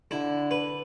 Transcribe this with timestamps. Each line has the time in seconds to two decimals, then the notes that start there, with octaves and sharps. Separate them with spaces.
0.11 D3 E4
0.51 B4